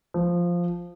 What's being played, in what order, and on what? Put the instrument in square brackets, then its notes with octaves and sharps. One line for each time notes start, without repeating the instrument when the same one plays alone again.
[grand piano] F3